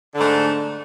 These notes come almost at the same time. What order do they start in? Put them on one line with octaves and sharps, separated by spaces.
D3 G#2 A3